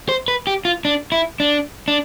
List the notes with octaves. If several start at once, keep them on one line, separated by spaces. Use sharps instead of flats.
C5
B4
G4
F4
D4
E4
D4
D4